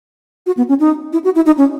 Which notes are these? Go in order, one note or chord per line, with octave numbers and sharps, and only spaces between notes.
F#4
B3
C#4
D#4
E4
F#4
E4
D#4
C#4